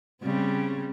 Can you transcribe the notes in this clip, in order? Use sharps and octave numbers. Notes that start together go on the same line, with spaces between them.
C#3 G3 C4